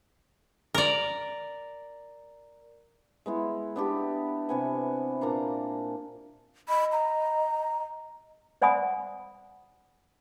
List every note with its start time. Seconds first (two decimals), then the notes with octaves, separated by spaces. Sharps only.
0.75 A#4 D5
3.26 G#3 B3 E4
3.76 B3 D4 G4
4.49 C3 B3 G#5
5.21 A#2 A#3 D4 A#5
6.69 D#5 B5
6.92 A#5
8.62 C5 D5 F#5 G#5 B5 D#6